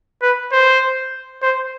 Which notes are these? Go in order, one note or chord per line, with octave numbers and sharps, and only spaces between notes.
B4
C5
C5